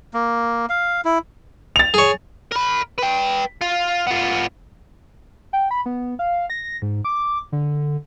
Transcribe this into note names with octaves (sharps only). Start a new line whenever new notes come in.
A#3
F5
E4
A6 F7
G#4 C#5
A#4 B5
B4 G5
F4
B3 F4
G5
B5
B3
F5
A#6
G#2
D6
D3